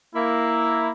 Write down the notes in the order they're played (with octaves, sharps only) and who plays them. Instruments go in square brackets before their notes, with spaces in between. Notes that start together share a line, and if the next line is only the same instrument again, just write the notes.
[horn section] A#3 E4